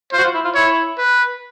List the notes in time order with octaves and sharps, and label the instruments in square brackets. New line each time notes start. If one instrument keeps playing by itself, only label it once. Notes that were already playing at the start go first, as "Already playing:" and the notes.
[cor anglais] F4 [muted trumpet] C5
[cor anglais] F#4
F4
E4
F4
[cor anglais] E4 [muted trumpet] C#5
[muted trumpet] B4